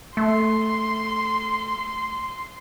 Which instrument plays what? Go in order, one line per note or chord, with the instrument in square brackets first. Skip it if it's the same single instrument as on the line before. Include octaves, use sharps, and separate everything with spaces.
[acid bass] A3 [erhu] C6